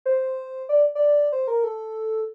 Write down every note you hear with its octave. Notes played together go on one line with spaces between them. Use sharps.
C5
D5
D5
C5
A#4
A4